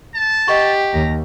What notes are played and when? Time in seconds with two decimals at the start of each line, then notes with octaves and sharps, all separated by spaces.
0.14 A5
0.48 G4 D#5 F#5 C#6
0.93 D#2 A#5